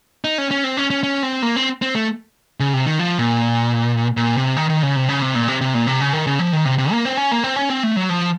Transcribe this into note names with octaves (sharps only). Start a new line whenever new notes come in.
D#4
C#4
C#4
C4
C#4
C#4
C#4
C4
A#3
C4
C4
A3
C#3
C3
D#3
F3
A#2
A#2
C3
D#3
D#3
C#3
C3
C#3
C3
A#2
C3
C3
A#2
C3
C#3
D#3
C#3
F3
D#3
C3
C3
A#3
C4
C#4
A#3
C4
C#4
C4
A3
F#3
F3